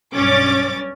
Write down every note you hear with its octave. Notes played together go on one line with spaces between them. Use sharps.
B1 G2 C#4 D6 A6